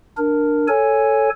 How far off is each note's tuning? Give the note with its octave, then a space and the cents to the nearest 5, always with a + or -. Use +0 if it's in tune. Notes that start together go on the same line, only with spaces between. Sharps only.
D4 +10 A#4 +0
A4 +0 C#5 +0 G#5 +0